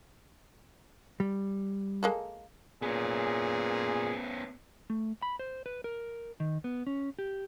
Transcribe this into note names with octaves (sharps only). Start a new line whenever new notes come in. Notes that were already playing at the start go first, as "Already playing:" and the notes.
G3
G#3 A#3 A4
A#2 B3 C#4 G#4
A3
B5
C5
B4
A#4
D#3
B3
C#4
G4